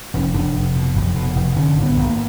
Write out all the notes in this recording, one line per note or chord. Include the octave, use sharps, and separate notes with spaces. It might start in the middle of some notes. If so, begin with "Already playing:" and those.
F1 C#4
F1 D4
F1
B2
F1
B2
F1
D3 C#4
G#1
B3
G#1
A#3